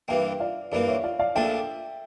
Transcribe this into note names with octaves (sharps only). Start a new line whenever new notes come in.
G2 E3 A#3 E5 G5
D5 F5
G2 E3 A#3 A#4 D5
C#5 E5
D5 F5
D5 F5
A#1 A#2 A3 D4 E5 G5